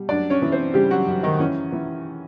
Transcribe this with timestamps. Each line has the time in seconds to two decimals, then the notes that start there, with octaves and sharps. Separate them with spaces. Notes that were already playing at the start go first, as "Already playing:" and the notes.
Already playing: B2 G3
0.09 F#2 D4 D5
0.30 C#4 C#5
0.42 E3
0.52 C4 C5
0.74 C#3 G3 G4
0.90 F#3 F#4
1.07 F#2
1.23 D#3 D#4
1.39 E3 C#4
1.72 E3